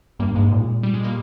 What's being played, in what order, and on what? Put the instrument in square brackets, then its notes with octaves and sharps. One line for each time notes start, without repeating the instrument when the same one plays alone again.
[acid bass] G2 [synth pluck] G3 A#3
[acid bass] G#2 [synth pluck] G#3
[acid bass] A#2
[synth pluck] G3
G#3
G3 A#3